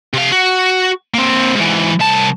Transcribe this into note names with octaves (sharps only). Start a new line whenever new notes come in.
C3 F5
F#4
A#3 C4
G#2 E3
C2 A5